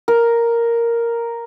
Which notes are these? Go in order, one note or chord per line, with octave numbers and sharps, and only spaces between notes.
A#4